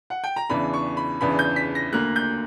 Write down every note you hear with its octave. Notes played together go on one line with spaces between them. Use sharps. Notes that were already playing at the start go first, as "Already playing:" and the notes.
F#5
G5
A#5
E2 C#3 E3 B3 D4 B5
C#6
B5
E2 C#3 E3 B3 D4 B5
G6
B6
A#6
D2 D3 A#3 F#6
G6